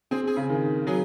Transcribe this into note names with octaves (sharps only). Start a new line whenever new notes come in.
C4 G#4
G#4
C#3
D#3
F#3 G#4